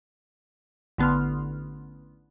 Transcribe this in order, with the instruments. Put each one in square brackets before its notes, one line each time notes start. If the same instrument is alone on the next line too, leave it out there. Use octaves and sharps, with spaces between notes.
[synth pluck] A1 D3 B3 C6 F6